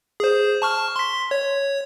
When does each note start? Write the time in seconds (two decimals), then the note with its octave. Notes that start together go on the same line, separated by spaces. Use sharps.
0.20 G#4 C5
0.62 A5 C#6 F6
0.96 C6 B6
1.31 C#5